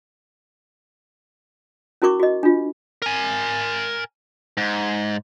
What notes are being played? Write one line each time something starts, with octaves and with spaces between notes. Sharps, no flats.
C#4 E4 F#4 A#4 C#6 D6
F#4 D#5
D4 F4
A#4 G#5
G#2